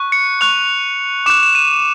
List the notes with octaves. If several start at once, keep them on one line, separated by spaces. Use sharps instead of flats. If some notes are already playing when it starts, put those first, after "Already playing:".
Already playing: C#6 F#6
C#7
C#6 F#6 F7
D6 F#6 E7
E7
D#7